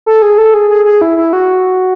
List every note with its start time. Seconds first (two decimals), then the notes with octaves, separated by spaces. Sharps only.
0.06 A4
0.22 G#4
0.38 A4
0.54 G#4
0.70 G#4
0.85 G#4
1.01 E4
1.17 E4
1.33 F#4